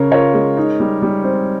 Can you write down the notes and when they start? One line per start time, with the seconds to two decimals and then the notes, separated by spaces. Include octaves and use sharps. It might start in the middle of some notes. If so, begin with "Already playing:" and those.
Already playing: C#3 C#4 A#4 C#5
0.12 F4 A#4 C#5
0.34 G#3
0.57 D#4
0.80 G3
1.02 G3
1.24 C4